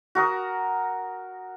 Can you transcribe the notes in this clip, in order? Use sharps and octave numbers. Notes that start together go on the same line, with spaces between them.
F#4 A#4 D#6